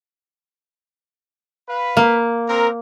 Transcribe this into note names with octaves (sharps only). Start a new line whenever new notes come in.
B4 F5 B5
A#3
C4 A#4